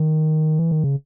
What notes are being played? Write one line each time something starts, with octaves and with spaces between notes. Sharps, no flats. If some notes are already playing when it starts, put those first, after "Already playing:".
Already playing: D#3
E3
D#3
C#3